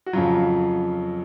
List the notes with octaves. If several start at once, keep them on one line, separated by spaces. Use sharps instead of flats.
F#4
F2 C#3 F#3 F4